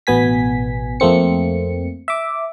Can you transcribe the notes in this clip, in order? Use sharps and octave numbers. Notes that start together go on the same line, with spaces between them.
A1 B2 B3 G#5 B6
F2 A3 A#3 C4 C#7
E5 D6